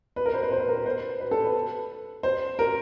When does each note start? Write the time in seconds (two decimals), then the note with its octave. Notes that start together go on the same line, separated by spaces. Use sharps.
0.16 B4
0.26 A#4
0.34 C5
0.43 B4
0.52 C5
0.60 B4
0.69 A#4
0.78 B4
0.86 C5
1.20 B4
1.31 A4
1.44 B4
2.23 C5
2.59 A#4